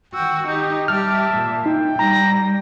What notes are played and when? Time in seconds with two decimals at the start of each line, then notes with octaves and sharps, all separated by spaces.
0.14 D#3 F#4 G5 E6
0.47 D#4 G4 G6
0.88 G3 G4 E5 A5 F6
1.31 A#2
1.66 D#4 G5
1.99 G3 A#5 A#6